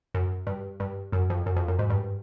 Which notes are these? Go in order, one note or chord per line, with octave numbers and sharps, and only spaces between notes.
F#2
G2
G2
F#2
F2
F#2
F2
F#2
G#2
G2